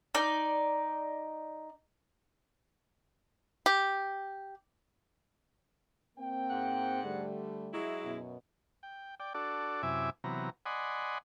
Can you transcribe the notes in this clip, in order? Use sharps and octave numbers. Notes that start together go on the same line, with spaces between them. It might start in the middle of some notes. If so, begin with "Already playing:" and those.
D#4 D5
G4
A#3 C4 G5
G#2 F#5
D3 G3 A3
F#3 G#3 E4
F#2 B2
G5
D5 G5
D4 F#4 A4 D5
F#2 C3 E4 E5 G#5 D6
C3 E3 F#3 B3 A#5
D5 D#5 F#5 G#5 B5 C6